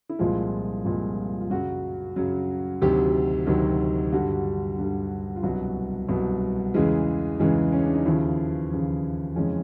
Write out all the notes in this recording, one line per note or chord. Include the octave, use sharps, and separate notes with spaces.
E4
C2 A#2 F3 G#3 F4
C2 A#2 F3 G#3
F4
F#2 C#3 F#3 F#4
F#2 C#3 F#3
D2 C3 D#3 F#3 G4
D2 C3 D#3 F#3
G2 D3 G3 F#4
G2 D3 G3
F4
C2 B2 F#3 F#4
C2 B2 F#3
E2 C#3 E3 G#3
E2 C#3 E3 G#3
C#4
D4
D#4
D#2 C#3 F3 E4
D#2 C#3 F3
F2 C#3 E3 G#3 C#4